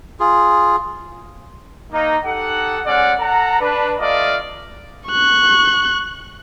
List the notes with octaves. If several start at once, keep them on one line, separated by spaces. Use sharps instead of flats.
F4 G#4
A#3 D#4
D#4 G4 A4 F#5
G#3 C#4 D5 F#5
A4 F#5 A#5
D4 B4
A3 F4 D5 D#5 F5
C#6 F#6